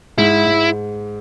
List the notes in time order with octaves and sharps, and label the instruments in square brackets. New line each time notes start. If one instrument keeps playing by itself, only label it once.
[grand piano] G#2 [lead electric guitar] E4
[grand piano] G#2